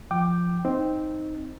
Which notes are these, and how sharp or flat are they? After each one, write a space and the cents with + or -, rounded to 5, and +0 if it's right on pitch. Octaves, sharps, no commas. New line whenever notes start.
F3 +0 G5 -10 D6 +15
C4 +0 D#4 +0